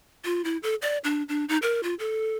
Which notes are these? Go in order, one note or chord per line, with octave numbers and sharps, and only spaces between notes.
F4
E4
A4
D5
D4
D4
D#4
A#4
F4
A4